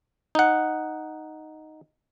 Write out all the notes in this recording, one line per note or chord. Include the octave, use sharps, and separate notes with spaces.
D#4 F#5